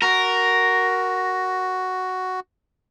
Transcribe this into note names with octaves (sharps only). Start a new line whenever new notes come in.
F#4 A#4